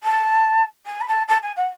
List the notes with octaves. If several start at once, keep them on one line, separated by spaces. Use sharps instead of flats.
A5
G#5
B5
A5
A5
G#5
F#5